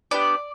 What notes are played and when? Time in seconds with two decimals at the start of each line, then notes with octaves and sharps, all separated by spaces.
0.11 B3 D4 G4 D5